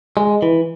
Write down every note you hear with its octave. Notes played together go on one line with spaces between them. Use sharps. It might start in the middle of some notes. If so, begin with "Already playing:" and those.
G#3
E3